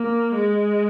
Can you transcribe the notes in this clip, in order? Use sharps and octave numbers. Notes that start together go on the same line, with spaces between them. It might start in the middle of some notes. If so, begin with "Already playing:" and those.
Already playing: A#3
G#3